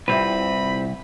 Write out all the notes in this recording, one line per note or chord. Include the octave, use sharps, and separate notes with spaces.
C2 C3 C4 E4 F4 B4 B5